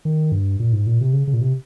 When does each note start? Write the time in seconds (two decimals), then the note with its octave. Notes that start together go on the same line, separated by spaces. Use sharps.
0.05 D#3
0.32 G2
0.60 A#2
0.73 G#2
0.87 A#2
1.01 C3
1.13 C#3
1.27 C#3
1.34 A#2
1.41 C3